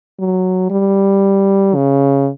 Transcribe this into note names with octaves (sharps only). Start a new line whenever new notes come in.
F#3
G3
C#3